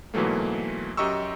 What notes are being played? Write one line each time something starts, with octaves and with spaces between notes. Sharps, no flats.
G#2 B2 E3 F#3 A3 A#3
F#2 G4 D#5 A#5 C#6 E6